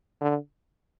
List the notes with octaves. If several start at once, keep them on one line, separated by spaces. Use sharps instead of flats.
D3